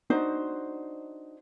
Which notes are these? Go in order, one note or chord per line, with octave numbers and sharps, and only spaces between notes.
D4 D#4 F#4 C5